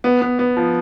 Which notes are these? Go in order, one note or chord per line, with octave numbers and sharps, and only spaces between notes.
B3
B3
B3
F3